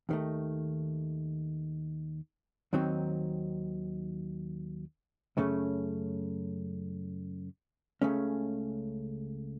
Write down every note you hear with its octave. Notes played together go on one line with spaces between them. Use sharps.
D#2 D#3 A3
D#2 D#3 F#3 C4 D#4
F#2 C#3 A3 C#4
C#2 C#3 A3 C#4